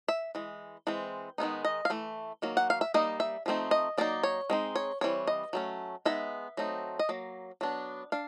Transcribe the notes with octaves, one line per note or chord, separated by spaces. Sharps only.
E5
E3 G#3
E3 G#3 C4
D#3 G#3 B3 D#4
D#5
F5
E3 A3
D#3 F#3 A#3
F#5
F5
E5
G3 A#3 D#4 D#5
E5
F3 A3 C4 D#4
D#5
F#3 A#3 D#4 D5
C#5
G#3 C4 D#4
C#5
E3 G3 C4 C#5
D#5
F#3 A3 C#4
G#3 B3 D#4 E5
F#3 A3 C4 D#4
D#5
F#3 A#3
F#3 B3 D4
D4 F5